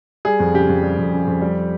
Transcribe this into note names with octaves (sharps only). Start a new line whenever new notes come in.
G3 G#4
F2
C#3 G4
F2
G3
F2
C#3
F2
G3